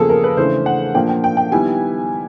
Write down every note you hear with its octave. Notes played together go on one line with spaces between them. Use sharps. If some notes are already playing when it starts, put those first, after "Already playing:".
Already playing: E2 C#3 F3 A#3 G#4 A4
A#4
B4
C#3 E3 A3 D4 C5
F#5
A#2 F3 A#3 D4 G5
G5
G5
G5
D#3 G3 B3 E4 G#5